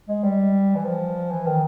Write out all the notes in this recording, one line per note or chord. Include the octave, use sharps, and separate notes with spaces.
G#3
G3
E3
F3
E3
D#3